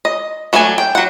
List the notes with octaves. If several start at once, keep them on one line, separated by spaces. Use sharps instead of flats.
D#5
F#3 A3 D4 A#4 G#5
G5
F#3 F#5